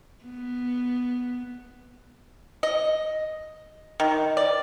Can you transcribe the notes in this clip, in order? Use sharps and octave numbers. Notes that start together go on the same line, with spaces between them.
B3
D#5
D#3
D5